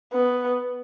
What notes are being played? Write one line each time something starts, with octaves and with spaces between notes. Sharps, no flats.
B3